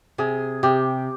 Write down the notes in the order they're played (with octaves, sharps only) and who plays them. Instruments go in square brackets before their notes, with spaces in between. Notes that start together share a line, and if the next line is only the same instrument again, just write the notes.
[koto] C3 [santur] G#4
[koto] C3 [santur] G4